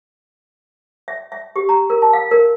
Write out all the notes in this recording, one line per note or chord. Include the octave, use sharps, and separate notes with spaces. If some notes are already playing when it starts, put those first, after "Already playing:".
E5
E5
G4
A#5
A#4
A5
F5
A#4